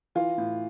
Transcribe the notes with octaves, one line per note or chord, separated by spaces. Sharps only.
E3 F4
A2